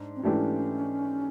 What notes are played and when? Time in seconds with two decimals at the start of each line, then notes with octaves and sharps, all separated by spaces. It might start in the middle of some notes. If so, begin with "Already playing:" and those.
Already playing: G#2 D4
0.16 C4
0.23 G#2 E3 A3 C#4 D4 G4